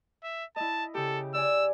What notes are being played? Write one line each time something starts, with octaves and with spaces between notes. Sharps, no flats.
E5
E4 D#5 A5
C#3 G4 A4
D5 G#5 E6